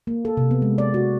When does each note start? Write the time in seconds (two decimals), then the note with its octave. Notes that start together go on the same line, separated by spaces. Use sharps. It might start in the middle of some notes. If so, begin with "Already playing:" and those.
0.07 A#3
0.25 A4
0.37 C3
0.51 B3
0.62 G#3
0.78 D5
0.94 F#4